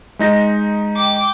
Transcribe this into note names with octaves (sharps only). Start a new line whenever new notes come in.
G#3 D#4 A#6
G5 D6